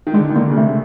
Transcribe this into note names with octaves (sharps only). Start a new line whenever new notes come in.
D#3
D3 G#3
D#3
D3 A#3
C#3
C3 A3